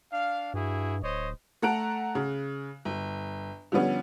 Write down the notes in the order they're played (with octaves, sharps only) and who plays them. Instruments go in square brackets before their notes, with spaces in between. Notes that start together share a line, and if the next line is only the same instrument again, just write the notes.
[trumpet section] D4 F5
[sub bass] G2 [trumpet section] E4 F#4 G#4
[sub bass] D1 [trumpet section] C5 C#5 D#5
[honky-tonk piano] A3 A4 F#5 A#5 F#6 D7
C#3
G1
D3 F3 G3 B3 C#4